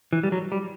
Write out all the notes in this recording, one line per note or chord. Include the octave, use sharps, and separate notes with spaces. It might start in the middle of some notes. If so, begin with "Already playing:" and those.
E3
G3
F#3
G3